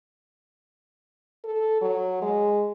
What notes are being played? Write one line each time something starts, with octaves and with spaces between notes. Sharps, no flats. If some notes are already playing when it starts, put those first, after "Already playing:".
A4
F#3
G#3